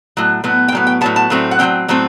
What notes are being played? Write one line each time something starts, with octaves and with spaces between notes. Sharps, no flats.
A2 F#3
A2 F#3 B3
G5
A2 F#3 B3
G5
A2 F#3 B3 A5
A5
A2 F#3 A3 C4
F#5
A2 F#3 A3 C4 G5
A2 F#3 A3 C4